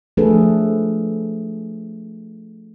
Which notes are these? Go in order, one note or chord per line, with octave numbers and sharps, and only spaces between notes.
F3 A3 D4 G#4 A4 B4